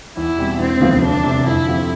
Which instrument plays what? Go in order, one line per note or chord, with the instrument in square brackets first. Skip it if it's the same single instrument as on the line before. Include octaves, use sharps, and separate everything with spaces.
[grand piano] E2 [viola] E4
[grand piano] B2 G3 C4
[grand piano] E1 [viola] C4
[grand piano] D2 C3 F3 B3
[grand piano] E1 [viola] D4
[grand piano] D2 C3
[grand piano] F2 [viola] E4
[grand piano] D3 F3 C4 G4